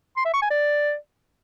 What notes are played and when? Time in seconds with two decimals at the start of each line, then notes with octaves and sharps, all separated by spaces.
0.17 C6
0.25 E5
0.34 C#6
0.42 G#5
0.51 D5